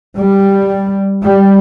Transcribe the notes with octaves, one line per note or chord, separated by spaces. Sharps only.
G3
G3